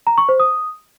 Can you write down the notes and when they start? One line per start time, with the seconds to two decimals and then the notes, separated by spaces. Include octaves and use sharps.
0.07 A#5
0.18 C#6
0.29 C5
0.40 D#6